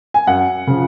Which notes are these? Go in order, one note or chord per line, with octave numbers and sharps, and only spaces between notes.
G#5
F#2 F#5
C#3 F3